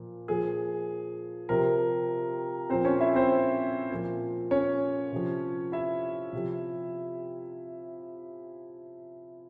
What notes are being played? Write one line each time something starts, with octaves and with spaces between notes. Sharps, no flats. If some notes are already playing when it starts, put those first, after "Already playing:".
Already playing: A#2 F3
A#2 F3 G#4
C3 F3 A#4
A#2 F3 C4 C5
C#4 C#5
E4 E5
C4 C5
A#2 F3
C#4 C#5
C3 F3
E4 E5
C3 F3